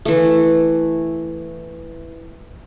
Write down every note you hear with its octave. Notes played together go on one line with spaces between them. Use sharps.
E3 A3